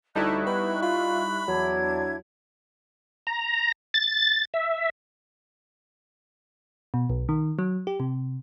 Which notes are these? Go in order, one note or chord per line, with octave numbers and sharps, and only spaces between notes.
D2 G3 D#4 E4 E5 A5 C#6 F#6
B3 B5
F4 B5
E2 F#3 D4 E4 G#6
A#5
A6
E5
B2
B1
D#3
F#3
G4
C3